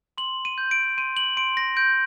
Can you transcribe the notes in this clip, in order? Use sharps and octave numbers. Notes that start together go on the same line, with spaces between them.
C6 F#7
D#7
G6
D7
C6 D#7
F#7
C6 D7
A#6
G6 D7